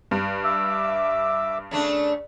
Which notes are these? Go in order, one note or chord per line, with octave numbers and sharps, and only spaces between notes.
G2
E5 D6 E6
C#3 A3 D4